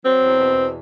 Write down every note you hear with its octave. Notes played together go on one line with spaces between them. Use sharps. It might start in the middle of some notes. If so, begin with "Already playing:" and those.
F#3 C4
E2
B2
E2